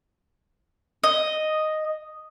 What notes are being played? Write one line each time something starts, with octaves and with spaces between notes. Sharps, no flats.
D#5